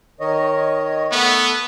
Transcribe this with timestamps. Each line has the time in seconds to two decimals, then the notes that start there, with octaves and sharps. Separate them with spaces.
0.20 D#3 C#5 D#5
1.11 A3 B3 E5